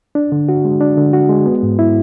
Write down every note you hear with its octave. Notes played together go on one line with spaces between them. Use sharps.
D4
D3
F#4
G#3
D4
D3
F#4
G#3
B3
G#2
E4